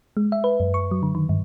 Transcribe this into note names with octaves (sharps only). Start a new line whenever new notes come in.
G#3
E5
B4
F#2
C#6
F#3
D3
D#3
G2